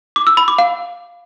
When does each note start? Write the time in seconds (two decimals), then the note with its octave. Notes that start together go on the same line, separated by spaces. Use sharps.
0.16 D6
0.27 E6
0.37 B5
0.48 D6
0.58 F5